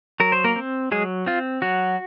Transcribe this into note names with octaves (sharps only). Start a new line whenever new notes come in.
F#3 A#4
C5
A#3 A#4
C4
F#3 G#3 G#4
C4 F4
F#3 F#4